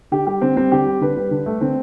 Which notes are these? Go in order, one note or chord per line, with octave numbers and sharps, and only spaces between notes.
D3 G4
G3 G4
D3 C4
G3 C4
D3 G4
G3
D3 B4
G3
D3
A3
D3 C4